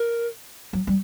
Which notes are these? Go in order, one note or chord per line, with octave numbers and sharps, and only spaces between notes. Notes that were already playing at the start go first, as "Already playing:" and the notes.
Already playing: A#4
F#3
G3